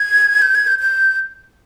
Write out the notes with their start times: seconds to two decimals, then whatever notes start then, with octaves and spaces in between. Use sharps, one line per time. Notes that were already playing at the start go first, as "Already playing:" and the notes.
Already playing: G#6
0.42 G6
0.55 G#6
0.67 G6
0.79 G6